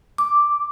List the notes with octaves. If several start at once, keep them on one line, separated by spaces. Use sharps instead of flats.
D6